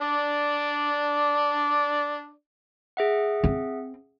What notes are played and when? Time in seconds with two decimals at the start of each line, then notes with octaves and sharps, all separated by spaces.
0.01 D4 D5
2.97 G#4 E5 F#5
3.44 C4